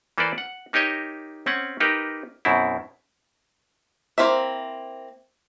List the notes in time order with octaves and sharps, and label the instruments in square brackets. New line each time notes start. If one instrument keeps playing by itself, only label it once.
[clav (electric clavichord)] E3 A#3 A4 B4 C5 D5
F#5
A#3 D#4 G4 C#5 D#5
C4 C#4 F#5
A#3 D#4 G4 A#4 B4
F#2 B2 C4 E4
[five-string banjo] A#3 C4 E4 E5